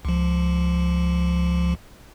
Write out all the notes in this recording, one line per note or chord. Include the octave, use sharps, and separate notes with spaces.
C#2 F3